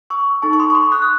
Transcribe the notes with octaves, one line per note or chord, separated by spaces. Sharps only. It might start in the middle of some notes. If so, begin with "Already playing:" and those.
C#6 E6
D#4 A4 A5 C#6
C#6
C6 D#6
C#6
C6 D#6
D#6 F#6
F#6